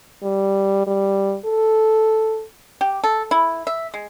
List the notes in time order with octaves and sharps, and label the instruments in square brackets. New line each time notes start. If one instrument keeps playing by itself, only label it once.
[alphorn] G3
G3
A4
[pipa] G4
A4
E4
E5
G#3